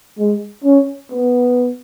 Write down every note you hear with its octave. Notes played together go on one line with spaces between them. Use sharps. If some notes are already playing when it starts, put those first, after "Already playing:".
G#3
C#4
B3